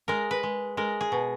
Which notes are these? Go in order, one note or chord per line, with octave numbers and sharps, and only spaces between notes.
G#3 A#4
B4
G#3
G#3 A#4
G#4
B2